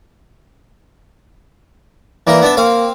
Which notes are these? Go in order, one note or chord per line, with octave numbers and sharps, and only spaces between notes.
E3 A#3 A#4 D5
B3 D4 E5
A#3 C4 F5